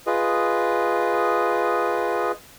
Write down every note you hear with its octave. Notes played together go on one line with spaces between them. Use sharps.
F4 G#4 B4 D#5